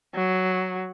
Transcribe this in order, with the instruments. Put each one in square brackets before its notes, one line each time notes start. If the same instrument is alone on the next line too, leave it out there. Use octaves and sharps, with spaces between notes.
[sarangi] F#3